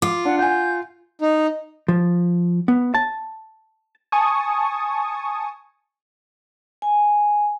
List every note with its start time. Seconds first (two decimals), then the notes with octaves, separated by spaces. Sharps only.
0.02 F4 D6
0.25 D4 F#5
0.39 F#5 G#5 G6
1.21 D#4
1.88 F3
2.68 B3
2.94 A5
4.12 G#5 A5 C#6 D#6
6.82 G#5